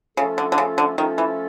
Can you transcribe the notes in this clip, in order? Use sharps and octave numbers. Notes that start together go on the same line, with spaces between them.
C#3 F3 A3 C#4 F4 A4
D3
D3
C#3
D3
D#3 F3 A3 C#4 F4 A4
E3